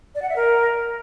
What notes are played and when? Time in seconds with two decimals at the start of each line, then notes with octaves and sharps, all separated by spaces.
0.15 D5
0.22 F#5
0.29 E5
0.36 A#4